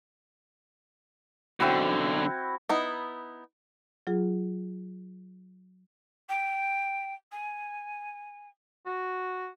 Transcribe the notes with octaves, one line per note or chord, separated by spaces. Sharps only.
B1 D3 C4 E4 F#4
B3 D#4 E4
F#3 F4 G#4
G5
G#5
F#4